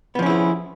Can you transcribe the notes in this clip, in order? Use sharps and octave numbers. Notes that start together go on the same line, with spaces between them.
F3 B3 C#4 E4 G#4